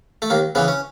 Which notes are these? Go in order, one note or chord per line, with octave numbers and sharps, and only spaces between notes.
A3
D#2 A#3
C#3 E3 B3
C#4